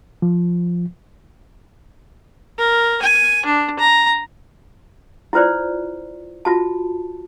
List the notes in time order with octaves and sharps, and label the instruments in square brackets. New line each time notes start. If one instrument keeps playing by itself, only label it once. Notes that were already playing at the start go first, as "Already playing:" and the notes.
[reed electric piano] F3
[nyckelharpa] A#4
G#5
D4
A#5
[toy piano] E4 F4 B4 C5 D5
F4 F#4 A5